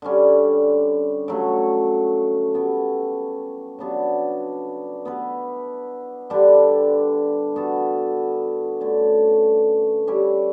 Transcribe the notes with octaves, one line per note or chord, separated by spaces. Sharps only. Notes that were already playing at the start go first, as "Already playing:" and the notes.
D3 G3 C#4
C#3 F#3 A3
B3 E4 G4
C#3 F#3 B3 D4
B3 E4 B4
D3 G3 D4
B3 F#4 A4
D3 A3 C#4
G3 C#4 E4 G4